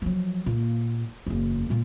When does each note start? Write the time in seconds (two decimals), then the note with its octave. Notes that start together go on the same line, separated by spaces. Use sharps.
0.02 F3 F#3
0.46 A#2 A#3
1.27 F#1 E2
1.70 A#2 F4